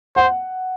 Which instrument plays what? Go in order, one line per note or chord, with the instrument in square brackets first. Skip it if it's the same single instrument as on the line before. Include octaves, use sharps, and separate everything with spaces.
[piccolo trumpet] C5 [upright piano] F#5